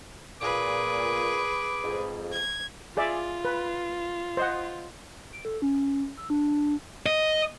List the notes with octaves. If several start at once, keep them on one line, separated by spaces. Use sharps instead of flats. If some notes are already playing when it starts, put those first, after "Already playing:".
A#2 G#4 B4 D6
F2 G#2
G#6
F4 G#4 D5 E5
B4
C5 D#5 F#5
D7
A4
C#4
E6
D4
D#5